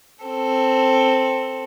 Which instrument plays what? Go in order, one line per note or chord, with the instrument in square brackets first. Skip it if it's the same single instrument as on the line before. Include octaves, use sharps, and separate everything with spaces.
[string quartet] C4 A4